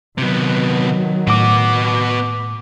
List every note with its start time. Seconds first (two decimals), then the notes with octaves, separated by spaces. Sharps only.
0.18 C3 D#3 F#3 B3
1.27 A2 B3 F#4 D6